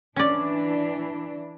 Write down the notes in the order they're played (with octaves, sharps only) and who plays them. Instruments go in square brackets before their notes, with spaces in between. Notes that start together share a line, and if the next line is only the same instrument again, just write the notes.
[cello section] E3 D4 [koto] C#4 D5